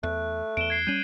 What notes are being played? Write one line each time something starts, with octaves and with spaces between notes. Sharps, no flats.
E2 A3 F#6
E2 D7 E7 G7
G#6 C7
G3 C#4 G6 D#7 F#7